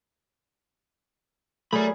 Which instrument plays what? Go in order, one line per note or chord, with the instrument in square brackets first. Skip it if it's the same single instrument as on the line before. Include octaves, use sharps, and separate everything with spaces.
[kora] F#3 G#4 A#4 [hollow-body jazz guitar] A3 [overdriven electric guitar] D5 B5